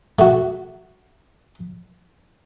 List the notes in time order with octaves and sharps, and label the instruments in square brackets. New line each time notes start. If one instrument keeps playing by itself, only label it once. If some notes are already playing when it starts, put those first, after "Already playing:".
[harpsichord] A3 F#4